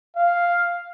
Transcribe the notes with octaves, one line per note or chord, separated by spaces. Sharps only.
F5